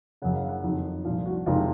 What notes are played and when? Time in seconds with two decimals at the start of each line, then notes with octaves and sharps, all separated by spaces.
0.22 F#1 F#2 C#3 F#5
0.36 F5
0.49 F#5
0.64 F2 D#3 F#3
1.05 C2 A#2 F3 F5
1.26 F#4
1.46 F#1 F2 C3 D#3 G#3 F4